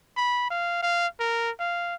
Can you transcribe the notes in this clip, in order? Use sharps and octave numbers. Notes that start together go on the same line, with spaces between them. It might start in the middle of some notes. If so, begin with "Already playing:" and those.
B5
F5
F5
A#4
F5